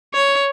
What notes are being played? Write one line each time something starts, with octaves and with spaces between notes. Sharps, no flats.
C#5